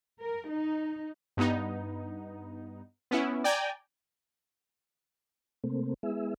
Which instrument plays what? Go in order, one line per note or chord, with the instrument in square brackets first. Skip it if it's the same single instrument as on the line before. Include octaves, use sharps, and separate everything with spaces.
[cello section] A#4
D#4
[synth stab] G2 B3 D#4
B3 C#4 E4
D5 G5 G#5 A#5
[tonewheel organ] C3 A3 A#3 C4
G#3 B3 E4 G#4 E5